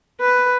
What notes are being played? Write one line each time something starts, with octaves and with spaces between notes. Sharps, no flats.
B4